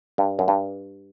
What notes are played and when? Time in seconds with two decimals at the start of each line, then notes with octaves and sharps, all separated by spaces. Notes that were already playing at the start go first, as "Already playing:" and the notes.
0.18 G2
0.39 F#2
0.48 G2